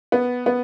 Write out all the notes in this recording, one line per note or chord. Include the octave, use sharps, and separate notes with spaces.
B3
B3